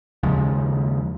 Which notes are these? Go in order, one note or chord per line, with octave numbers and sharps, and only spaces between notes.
D#2 C#3 F3 G#3